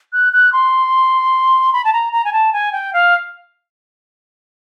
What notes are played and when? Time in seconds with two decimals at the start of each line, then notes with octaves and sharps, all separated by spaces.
0.13 F#6
0.33 F#6
0.53 C6
1.73 B5
1.84 A5
1.93 A#5
2.13 A#5
2.25 G#5
2.33 A5
2.53 G#5
2.72 G5
2.93 F5